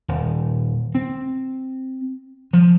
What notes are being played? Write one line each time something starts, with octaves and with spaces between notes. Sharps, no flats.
D#1
C4
F3